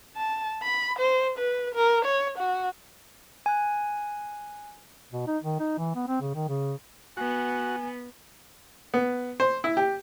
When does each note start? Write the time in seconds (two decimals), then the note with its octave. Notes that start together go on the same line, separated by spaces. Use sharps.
0.16 A5
0.63 B5
0.99 C5
1.38 B4
1.75 A#4
2.05 C#5
2.39 F#4
3.46 G#5 F#6
5.12 B2
5.27 D#4
5.44 D#3
5.60 D#4
5.78 E3
5.95 B3
6.08 C4
6.21 C#3
6.35 D#3
6.49 C#3
7.17 B3 F#4 G#5
8.94 B3
9.40 C5
9.64 E4
9.77 G4